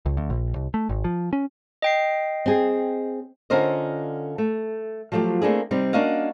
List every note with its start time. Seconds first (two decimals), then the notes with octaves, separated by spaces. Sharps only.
0.06 C#2
0.17 D2
0.30 A#1
0.55 C2
0.74 A3
0.89 G#1
1.04 F3
1.33 C#4
1.82 D#5 G5 C7
2.46 C4 G#4
3.50 D3 C#4 F4 A#4 C5 D#5
4.38 A3
5.12 F3 F#3 A3 F4 G4
5.42 A3 A#3 C4 D4 E4 G#4
5.71 C3 G3 C4 D#4
5.93 A#3 C#4 D4 F#4 D#5 F5